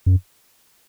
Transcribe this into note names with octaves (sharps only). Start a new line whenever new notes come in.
F#2